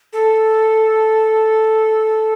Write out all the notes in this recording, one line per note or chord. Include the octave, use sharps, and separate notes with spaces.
A4